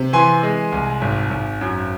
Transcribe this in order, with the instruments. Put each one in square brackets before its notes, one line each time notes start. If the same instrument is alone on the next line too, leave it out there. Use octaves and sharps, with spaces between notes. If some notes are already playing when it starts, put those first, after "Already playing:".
Already playing: [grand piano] C3
E3 G#5 C6
G#3
C2
G#1
G#1
F#2